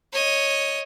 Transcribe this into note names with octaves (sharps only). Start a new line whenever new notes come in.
C#5 D#5